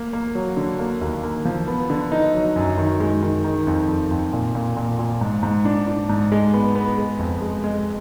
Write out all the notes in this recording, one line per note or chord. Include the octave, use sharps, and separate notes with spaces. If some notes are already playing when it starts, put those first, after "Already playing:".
Already playing: A#3
A#3
F#3
D3
A#3
D#2
A#3
F3
B3
D3
D#4
F#3
F#2
D#3
G#3
D#3
D#3
F2
F2
F2
A#2
A#2
A#2
A#2
G#2
G#2
D4
D4
G#2
G#3
B3
B3
G#3
F2
G#3
G#3